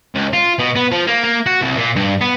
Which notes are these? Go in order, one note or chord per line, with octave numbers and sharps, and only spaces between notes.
C#2
F4
B2
B3
F3
A#3
A#3
F#4
C2
A#2
G2
B3